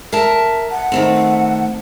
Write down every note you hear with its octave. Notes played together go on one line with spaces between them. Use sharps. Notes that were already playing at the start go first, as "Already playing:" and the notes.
A#4 E5 A5
F#5
D#3 A3 C4